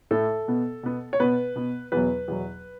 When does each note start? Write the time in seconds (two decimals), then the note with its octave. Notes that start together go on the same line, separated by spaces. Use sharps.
0.11 A2 A3 A4
0.48 B2 B3
0.83 B2 B3
1.13 C#5
1.20 B2 B3 B4
1.55 B2 B3
1.92 E2 B2 F#3 B4
2.28 E2 B2 F#3